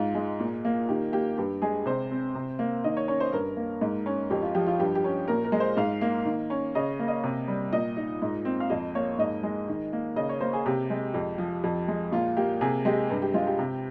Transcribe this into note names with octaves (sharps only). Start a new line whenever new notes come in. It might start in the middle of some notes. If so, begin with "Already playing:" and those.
Already playing: G#2 F4
G#3
A#2
A#3
D#3 G4
A#3 G4
G2 G4
G#3 G#4
C3 C5
C4
C3
A#3
D#3 D#5
C#5
C#4 C#5
C5
G2 A#4
A#3
G#2
C#4
F2 G4
F4
F3 G4
F4
G2 G4
G4
C#4
A#2 A#4
A#4
G#3
C5
G#2 F5
A#3
D#3
C#4
C#3 D#5
A#3
D#5
C3
G3
A#2 D#5
D#4
G#2
C4
F5
F2 D#5
A#3 C#5
G#2 D#5
G#3
D#3
A#3
C#3 D#5
C#5
A#3 C5
G#4
C3 G4
G#3
F2
F3
F2
G#3
A#2 F4
A#3 G4
C3 G#4
G#3 G4
G2
G4
G#3 F4
G4
C3